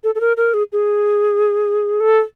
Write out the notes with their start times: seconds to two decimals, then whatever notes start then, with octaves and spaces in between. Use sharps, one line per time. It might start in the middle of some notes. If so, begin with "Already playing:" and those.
0.04 A4
0.15 A4
0.20 A#4
0.37 A#4
0.54 G#4
0.72 G#4
2.00 A4